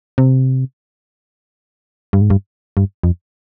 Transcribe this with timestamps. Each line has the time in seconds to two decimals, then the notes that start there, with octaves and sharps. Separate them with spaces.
0.18 C3
2.13 G2
2.21 G#2
2.30 G2
2.77 G2
3.03 F2